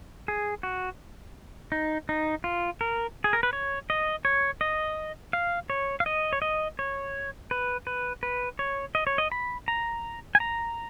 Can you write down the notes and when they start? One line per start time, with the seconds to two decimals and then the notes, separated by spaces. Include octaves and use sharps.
0.28 G#4
0.63 F#4
1.72 D#4
2.09 D#4
2.44 F4
2.81 A#4
3.24 G#4
3.33 A#4
3.43 B4
3.53 C#5
3.90 D#5
4.25 C#5
4.61 D#5
5.33 F5
5.70 C#5
6.00 F5
6.06 D#5
6.33 C#5
6.42 D#5
6.79 C#5
7.51 B4
7.87 B4
8.23 B4
8.59 C#5
8.95 D#5
9.07 C#5
9.18 D#5
9.32 B5
9.68 A#5
10.35 G#5
10.40 A#5